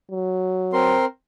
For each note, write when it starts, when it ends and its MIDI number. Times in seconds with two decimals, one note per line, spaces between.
0.11 0.96 54
0.73 1.05 60
0.73 1.05 70
0.73 1.05 84